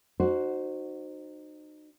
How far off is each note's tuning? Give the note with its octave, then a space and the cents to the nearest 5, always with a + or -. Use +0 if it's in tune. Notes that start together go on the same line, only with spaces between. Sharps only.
D#4 -30 F#4 +0 C5 +0